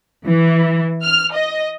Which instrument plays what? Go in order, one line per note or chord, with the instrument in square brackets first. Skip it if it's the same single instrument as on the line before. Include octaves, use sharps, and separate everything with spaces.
[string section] E3
F6
D#5